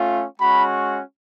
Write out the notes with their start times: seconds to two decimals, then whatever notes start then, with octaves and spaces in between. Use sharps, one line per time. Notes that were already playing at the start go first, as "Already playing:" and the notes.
Already playing: A3 C#4 F4
0.40 G#3 C#4 F#4 B5